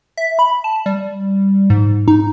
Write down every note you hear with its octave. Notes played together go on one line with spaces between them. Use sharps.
E5
B5
A5
G3
G#2
D#4